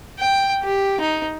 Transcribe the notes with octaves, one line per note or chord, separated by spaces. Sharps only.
G5
G4
D#4